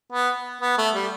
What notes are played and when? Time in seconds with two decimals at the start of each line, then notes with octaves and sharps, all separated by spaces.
0.12 B3
0.62 B3
0.78 A3
0.95 G3